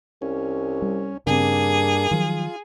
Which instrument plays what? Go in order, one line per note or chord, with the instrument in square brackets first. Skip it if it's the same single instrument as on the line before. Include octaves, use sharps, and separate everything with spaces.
[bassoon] C2 [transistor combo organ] C#4
[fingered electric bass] G3
[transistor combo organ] G2 D4 [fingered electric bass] C#3 C4 [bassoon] A#3 [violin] G#4
[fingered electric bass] D#3 F3 F#3 [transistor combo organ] F4